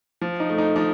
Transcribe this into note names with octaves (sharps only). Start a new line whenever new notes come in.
F3
D#4
A3
D#4
F3 D#4